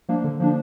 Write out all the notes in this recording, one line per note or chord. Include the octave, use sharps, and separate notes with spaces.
F3 A#3 D4
D3
F3 A#3 D4